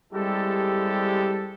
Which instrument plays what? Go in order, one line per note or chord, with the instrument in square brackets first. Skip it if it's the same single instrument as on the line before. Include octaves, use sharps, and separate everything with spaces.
[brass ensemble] G3 G#3 C4 E4 G4 A4